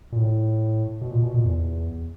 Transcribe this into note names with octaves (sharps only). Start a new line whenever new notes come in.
A#2
A2
B2
A#2
B2
A#2
E2